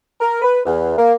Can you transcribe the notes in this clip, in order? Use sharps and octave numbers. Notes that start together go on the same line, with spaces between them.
A#4
B4
E2
A#3